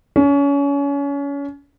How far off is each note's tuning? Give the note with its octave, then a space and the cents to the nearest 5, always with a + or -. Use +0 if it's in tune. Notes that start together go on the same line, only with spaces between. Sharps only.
C#4 +30